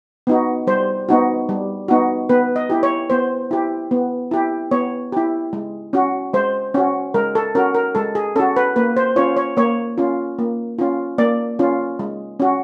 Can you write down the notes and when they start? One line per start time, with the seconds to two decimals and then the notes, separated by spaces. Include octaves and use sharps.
0.27 B3 D#4 F#4
0.67 G3 C5
1.09 B3 D#4 F#4
1.49 G3
1.88 B3 D#4 F#4
2.29 B3 B4
2.56 D#5
2.70 E4 G4
2.83 C#5
3.10 B3 C5
3.51 E4 G4
3.91 B3
4.31 E4 G4
4.71 B3 C#5
5.12 E4 G4
5.53 G#3
5.93 C#4 F#4
6.33 G#3 C5
6.74 C#4 F#4
7.14 G#3 A#4
7.35 A4
7.55 C#4 F#4 A#4
7.75 A#4
7.95 G#3 A4
8.15 G#4
8.36 C#4 F#4 A4
8.56 B4
8.76 A#3 B4
8.97 C5
9.16 C#4 F4 C#5
9.37 C#5
9.57 A#3 C#5
9.98 C#4 F4
10.39 A#3
10.79 C#4 F4
11.18 A#3 D5
11.59 C#4 F4
11.99 G#3
12.40 C#4 F#4